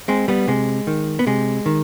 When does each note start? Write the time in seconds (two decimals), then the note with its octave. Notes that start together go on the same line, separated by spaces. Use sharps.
0.08 G#3 C4
0.28 G3 B3
0.48 C3 G#3
0.87 D#3
1.19 B3
1.27 C3 G#3
1.66 D#3